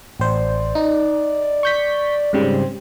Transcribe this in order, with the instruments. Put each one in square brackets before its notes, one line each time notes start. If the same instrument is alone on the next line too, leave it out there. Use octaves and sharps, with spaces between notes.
[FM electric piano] A1 C5 [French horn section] D5
[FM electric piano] D#4
C#6 G6 B6
[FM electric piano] G#2 C#3 G3 [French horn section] C4 C5